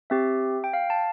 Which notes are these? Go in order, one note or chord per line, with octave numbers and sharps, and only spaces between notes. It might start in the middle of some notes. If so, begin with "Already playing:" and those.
C4 G4 E5
G5
F5
A5